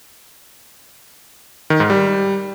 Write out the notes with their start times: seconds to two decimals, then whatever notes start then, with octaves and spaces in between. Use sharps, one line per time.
1.70 D#3
1.80 G#2
1.90 G3